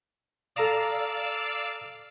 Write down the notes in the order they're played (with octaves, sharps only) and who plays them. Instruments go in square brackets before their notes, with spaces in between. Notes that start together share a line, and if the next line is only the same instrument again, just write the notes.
[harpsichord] A4 A#5 D#6 [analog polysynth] D5 F5 E6